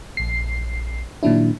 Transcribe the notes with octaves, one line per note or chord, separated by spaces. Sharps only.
A#1 C7
A#2 D#3 F#3 D4 E4